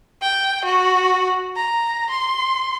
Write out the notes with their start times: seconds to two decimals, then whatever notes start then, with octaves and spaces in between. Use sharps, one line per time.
0.22 G5
0.65 F#4
1.56 A#5
2.10 C6